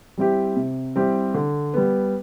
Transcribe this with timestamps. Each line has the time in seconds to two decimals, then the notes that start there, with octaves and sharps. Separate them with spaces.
0.17 G3 C4 E4 G4
0.56 C3
0.96 G3 C4 E4 G4
1.34 D3
1.74 G3 B3